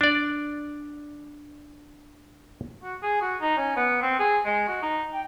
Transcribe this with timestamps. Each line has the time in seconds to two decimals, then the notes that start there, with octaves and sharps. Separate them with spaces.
0.01 D4 D5
2.83 F#4
3.03 G#4
3.21 F#4
3.41 D#4
3.57 C#4
3.77 B3
4.02 C4
4.19 G#4
4.45 G#3
4.68 F#4
4.82 D#4
5.13 G5